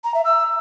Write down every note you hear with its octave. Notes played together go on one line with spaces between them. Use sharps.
A#5
E5
E6